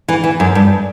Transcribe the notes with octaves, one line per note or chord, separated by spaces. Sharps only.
E3
E3
F#2
G2